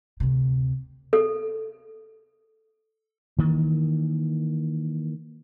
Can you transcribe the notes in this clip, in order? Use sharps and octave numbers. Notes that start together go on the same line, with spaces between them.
D2 C3
A4
D#3 E3 A#3